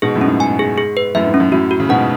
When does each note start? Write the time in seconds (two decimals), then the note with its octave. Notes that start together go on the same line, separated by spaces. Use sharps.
0.02 G#2 B2 G#4
0.15 F#2 A2
0.21 C#4
0.28 G#2
0.40 G#5
0.59 G#4
0.78 G#4
0.97 B4
1.15 F#2 A2 E5
1.27 G#2
1.34 C#4
1.40 F#2
1.52 F#2 A2 F#4
1.71 F#4
1.80 C#3
1.89 G#2 B2 F#5